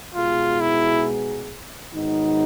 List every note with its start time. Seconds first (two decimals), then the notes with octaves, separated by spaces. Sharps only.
0.15 B2 G#3 B3 D#4 F4 G#4
0.61 E4
1.93 G#2 D#3 F#3 B3 D#4